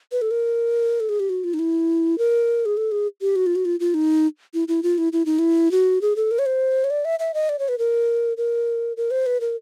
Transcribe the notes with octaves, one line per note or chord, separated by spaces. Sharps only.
B4
A4
A#4
A4
G#4
G4
F#4
F4
D#4
E4
A#4
G#4
A4
G#4
G4
F#4
F4
F#4
F4
F4
D#4
E4
E4
F4
E4
E4
D#4
E4
F#4
G#4
A4
A#4
C#5
C5
C#5
D5
E5
E5
D#5
D5
C#5
B4
A#4
A#4
A#4
C5
B4
A#4